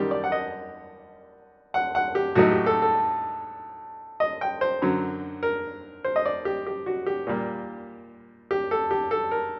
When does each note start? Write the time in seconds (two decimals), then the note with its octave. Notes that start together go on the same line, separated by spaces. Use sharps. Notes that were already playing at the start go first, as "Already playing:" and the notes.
Already playing: F#2 D#3 G3 G4
0.11 D5
0.24 F#5
0.32 D#5
1.74 F#5
1.95 F#5
2.15 G4
2.35 A2 F#3 A3 D#4 F#4
2.51 G4
2.66 A4
2.82 A4
4.20 D#5
4.41 G5
4.61 C5
4.82 F#2 D3 F#3
5.43 A#4
6.04 C5
6.16 D#5
6.26 D5
6.45 G4
6.66 G4
6.86 F#4
7.06 G4
7.27 A#2 G3 A#3
8.51 G4
8.71 A4
8.91 G4
9.11 A4
9.31 A#4